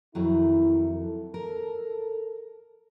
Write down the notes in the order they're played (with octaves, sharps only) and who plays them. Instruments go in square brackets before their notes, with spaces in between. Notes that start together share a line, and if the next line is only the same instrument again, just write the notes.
[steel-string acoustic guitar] F2 D#3 F#3 [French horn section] E4
[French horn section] A4
[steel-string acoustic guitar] A#4